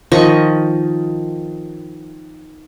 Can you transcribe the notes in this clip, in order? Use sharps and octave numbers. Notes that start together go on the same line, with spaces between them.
D#3 F3 D#5 C#6